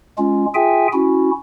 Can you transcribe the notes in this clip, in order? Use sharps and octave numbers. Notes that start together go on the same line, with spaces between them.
G#3 C#4 F4
F4 G#4 E5 G5 G#5
C#4 E4 F#4